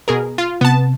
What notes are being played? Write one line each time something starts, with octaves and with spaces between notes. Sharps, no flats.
B2 G#4 A#4
F4
C3 B3 A5